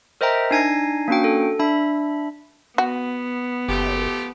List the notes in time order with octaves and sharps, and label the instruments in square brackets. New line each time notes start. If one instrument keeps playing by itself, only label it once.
[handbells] A#4 C5 D#5 E5 G5 A#5
D4 D#4 G#5 G#6 A#6 C7
A#3 C#4 D4 F#4 G5
A4
D4 E5 B5
[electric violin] B3 [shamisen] F#4
[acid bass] F#1 [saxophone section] F3 A3 G4